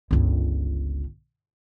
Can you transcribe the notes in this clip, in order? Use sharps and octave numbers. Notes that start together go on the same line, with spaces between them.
G1 C#2